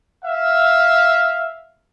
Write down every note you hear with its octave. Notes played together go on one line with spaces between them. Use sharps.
E5 F5